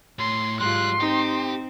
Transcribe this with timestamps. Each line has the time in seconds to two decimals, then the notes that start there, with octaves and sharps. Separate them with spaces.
0.19 A2 C6
0.60 G#2 F#3 G3 F4 C6 F#6
1.00 C4 D#4 G4